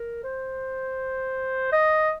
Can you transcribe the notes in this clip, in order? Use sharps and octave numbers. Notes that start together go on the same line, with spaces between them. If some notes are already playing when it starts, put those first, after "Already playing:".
Already playing: A#4
C5
D#5